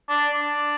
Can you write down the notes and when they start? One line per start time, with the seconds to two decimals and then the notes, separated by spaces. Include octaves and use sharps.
0.09 D4
0.34 D4